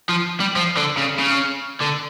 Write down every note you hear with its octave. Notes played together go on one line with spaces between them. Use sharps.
F3
G3
F3
D3
C#3
C#3
D3